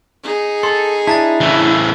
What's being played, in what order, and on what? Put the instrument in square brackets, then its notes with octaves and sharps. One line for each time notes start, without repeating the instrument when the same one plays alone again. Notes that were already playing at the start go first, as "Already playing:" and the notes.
[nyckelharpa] D#4 G#4
[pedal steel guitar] A4 [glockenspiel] C6
[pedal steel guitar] D4 E4 [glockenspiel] A5 A#5 A6
[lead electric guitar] C#3 E3